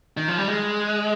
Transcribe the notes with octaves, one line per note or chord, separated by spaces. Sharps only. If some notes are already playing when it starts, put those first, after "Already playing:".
D#3
F3
G3
G#3